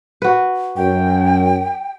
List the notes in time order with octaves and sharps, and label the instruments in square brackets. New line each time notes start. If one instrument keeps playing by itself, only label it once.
[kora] F#4 B4
[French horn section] F#2 [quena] G5